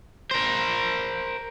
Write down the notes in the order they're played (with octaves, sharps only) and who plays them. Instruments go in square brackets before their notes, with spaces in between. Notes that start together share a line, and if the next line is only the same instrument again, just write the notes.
[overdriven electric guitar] A#4 C5